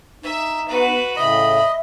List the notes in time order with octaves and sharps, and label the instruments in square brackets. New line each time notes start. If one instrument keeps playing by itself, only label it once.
[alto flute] D#4 [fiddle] E5
[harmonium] B3 [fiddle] F#4 B4
[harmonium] A2 C#3 [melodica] D#5 [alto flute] E5 [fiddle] B5